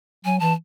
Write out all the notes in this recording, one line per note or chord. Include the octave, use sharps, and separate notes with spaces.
F#3 G#5
E3 A5